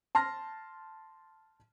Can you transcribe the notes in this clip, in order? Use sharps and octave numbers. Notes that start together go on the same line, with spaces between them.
A5 C6 F6 A#6